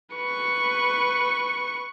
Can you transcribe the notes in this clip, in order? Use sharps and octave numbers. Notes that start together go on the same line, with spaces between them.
B4 C#6